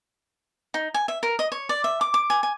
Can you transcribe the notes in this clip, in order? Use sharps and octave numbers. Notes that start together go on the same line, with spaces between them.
D#4
G#5
E5
A#4
D#5
C#5
D5
E5
D6
D6
G#5
G#5